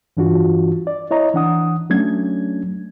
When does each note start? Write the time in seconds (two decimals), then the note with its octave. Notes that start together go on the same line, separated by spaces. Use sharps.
0.17 G2 E3 D4 F4 F#4
0.87 D5
1.11 E4 C#5 D#5 A#5
1.34 E3 D4 F#5 D#6
1.90 F#3 A3 C#4 D4 G#6